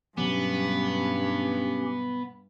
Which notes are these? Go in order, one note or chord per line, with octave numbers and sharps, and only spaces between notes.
G2 B2 F#3 G3 B3 C#4 G4